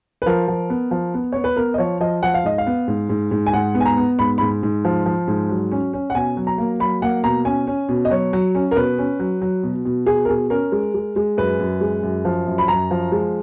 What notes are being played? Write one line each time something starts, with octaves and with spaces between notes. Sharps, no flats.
B4
F3 A#4
F3
B3
F3
B3
B3 C#5
B4
B3 A#4
D#5
F3 C#5
F3 D#5
F3 F#5
F5
G#2 D#5
F5
B3
G#2
G#2
G#2
G#5
G#2 F#5
B3
G#5
A#5
B3
G#2 B5
G#2 B5
G#2
F3
F3
G#2
F#3
C#4
C#4
F#5
B2 G#5
F#3
A#5
A#3
F#3 B5
A#3 F#5
B2 A#5
C#4 G#5
C#4
B2
D#5
F#3 C#5
F#3
C#4
A#4
B2 B4
C#4
F#3
F#3
B2
B2
B2 G#4
A#4
B2 G#4
C#4 A#4
G#3
G#3
G#3
F#2 B4
F#2
G#3
F#2
F3
F#2
B5
F#2 A#5
F3
G#3